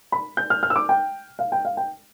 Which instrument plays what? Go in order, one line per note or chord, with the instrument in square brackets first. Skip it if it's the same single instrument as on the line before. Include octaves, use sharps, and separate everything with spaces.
[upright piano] B5
G6
F6
F6
E6
D6
G5
F5
G5
F5
G5